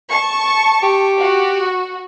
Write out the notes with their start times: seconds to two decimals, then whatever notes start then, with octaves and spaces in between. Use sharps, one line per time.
0.10 A5 C#6
0.83 G4
1.19 F#4